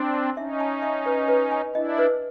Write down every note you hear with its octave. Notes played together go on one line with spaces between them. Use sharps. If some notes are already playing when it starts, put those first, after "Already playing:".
Already playing: C4 D4
A5
C#4 D#4 E5
A5
E5
B4
B4
G#5
D4 E4 D#5
B4